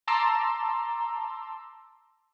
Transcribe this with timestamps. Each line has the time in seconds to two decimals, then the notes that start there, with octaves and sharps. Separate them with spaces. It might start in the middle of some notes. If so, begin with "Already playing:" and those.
0.08 A5 A#5 C6 D6 E6